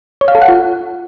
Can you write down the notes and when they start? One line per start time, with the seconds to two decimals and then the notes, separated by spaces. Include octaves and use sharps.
0.21 C#5
0.28 F5
0.35 A4
0.42 F#5
0.48 F4